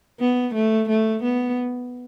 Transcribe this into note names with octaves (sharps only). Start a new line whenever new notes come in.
B3
A3
A3
B3